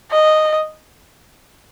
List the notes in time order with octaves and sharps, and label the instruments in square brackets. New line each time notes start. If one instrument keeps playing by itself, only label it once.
[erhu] D#5